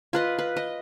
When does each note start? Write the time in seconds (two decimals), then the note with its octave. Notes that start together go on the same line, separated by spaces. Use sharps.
0.13 F4 B4 D#5
0.39 B4
0.56 D#5